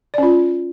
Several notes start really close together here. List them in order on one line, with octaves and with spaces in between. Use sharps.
D5 C#4 F4